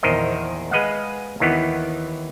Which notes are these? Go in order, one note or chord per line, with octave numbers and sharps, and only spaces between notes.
A#1 E2 D#3 A#4 C5 D#5
G#3 B4 D#5 F5 F#5
D#2 D#3 E3 B3